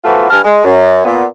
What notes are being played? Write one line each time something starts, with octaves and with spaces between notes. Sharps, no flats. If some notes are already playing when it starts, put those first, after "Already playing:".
E3 F3 A3 B3 F4 F#4
G2 G#5 A5 F6
G#3
F#2
A#2 B3